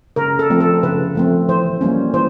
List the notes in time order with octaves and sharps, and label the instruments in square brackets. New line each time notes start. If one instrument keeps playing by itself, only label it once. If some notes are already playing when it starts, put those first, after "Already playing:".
[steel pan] C#3 A#4
A4
F3 A3 C4
A4
C#3 B4
F3 A3 C4
E3 C5
G3 A#3 C#4
E3 C5